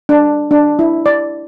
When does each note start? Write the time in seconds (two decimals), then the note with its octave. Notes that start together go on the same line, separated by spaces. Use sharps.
0.09 D4
0.51 D4
0.79 E4
1.06 D5